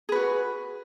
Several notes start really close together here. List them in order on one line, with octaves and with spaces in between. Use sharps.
G#4 B4 F#4